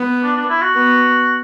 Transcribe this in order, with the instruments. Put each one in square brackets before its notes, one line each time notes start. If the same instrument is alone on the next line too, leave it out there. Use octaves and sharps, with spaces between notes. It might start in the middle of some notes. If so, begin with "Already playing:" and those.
Already playing: [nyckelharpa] B3
[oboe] D4
D4
E4
F#4
[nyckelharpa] B3